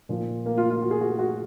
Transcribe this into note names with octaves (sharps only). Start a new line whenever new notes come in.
A#2 F3
A#3
F4
F4
F#4
G#4
F#4
G#4
F#4